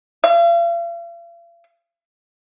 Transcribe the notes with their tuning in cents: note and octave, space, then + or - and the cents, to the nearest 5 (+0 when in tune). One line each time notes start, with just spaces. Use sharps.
F5 -45